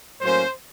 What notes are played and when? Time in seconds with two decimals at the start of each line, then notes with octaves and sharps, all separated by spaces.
0.21 A2 F#3 A#3 C#4 C5